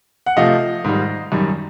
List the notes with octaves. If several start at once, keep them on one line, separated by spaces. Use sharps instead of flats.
F#5
C3 F3 A3 D#5 F5
G#2 D#3 G3
F#2 D#3 G3